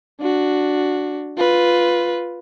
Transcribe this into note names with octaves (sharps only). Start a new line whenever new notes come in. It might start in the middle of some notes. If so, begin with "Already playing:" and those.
D4 F#4
F4 B4